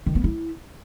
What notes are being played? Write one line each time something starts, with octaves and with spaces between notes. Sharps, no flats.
D#3
B3
E4